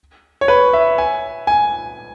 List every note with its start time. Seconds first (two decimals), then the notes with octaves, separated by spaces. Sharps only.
0.41 C#5
0.48 B4
0.73 E5
0.98 G#5
1.47 G#5